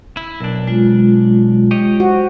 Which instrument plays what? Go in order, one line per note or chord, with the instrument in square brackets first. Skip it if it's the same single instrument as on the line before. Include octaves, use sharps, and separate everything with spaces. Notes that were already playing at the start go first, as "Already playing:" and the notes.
[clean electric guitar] E4
[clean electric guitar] B1 D4 [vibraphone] A#4
[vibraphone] G#3 F4
[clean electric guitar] G4 C#5 D#5
[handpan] F#4 [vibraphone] C5